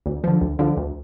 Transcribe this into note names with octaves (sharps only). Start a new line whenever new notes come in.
D2
D3 F3
D2
D3 F3
D2